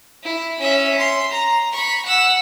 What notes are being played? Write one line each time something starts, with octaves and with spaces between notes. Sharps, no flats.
E4
C#4 E5
C6
A#5
B5 C#6
F#5 E6